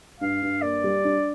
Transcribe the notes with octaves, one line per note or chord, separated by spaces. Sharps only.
G2 F5
G2
A#3 D5
G3
D4